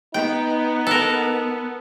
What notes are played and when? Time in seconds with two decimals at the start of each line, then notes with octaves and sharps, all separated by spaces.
0.14 B3 D#4 G5
0.87 A4 A#4